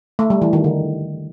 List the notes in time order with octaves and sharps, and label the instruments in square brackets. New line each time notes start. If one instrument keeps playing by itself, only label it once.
[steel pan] A3
G3
E3
D#3
D3